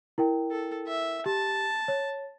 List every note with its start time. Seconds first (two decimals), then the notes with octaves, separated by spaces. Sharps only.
0.18 E4 A#4 G5
0.51 A4
0.87 E5
1.26 G4 A5
1.88 C#5